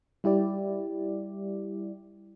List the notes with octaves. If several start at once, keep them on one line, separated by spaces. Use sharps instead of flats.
G3 E4 G4 D5